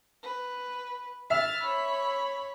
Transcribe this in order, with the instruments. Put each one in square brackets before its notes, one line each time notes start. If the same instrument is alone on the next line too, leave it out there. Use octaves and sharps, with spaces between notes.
[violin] B4
[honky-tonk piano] E5 [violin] F6 A6
[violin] C#5 B5